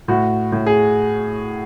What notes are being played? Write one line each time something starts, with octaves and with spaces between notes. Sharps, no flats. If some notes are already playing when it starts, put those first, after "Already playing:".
A2 F#4
A2
G#4